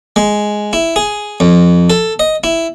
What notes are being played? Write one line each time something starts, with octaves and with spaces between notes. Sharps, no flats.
G#3
E4
G#4
F2
A4
D#5
E4